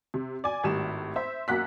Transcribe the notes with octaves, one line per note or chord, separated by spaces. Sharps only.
C3
D5 G#5
G#1 A2 G3 E7
C5 E5
F#2 A#3 F#5 F#6 B6